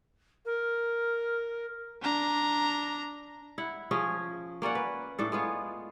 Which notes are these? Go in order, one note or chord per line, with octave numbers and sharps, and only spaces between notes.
A#4
D4 A#5
E4 F#5
F3 C#4 G#4
A#3 C#4 D5 F#5
B4
A2 D4 A4
G#3 B3 F4 C#5